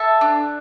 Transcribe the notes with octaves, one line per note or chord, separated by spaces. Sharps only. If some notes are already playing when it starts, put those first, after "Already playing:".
Already playing: A4 E5 A5
D4